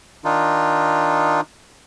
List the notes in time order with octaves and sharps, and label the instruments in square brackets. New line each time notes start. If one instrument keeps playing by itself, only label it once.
[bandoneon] D#3 D4 D#4 F4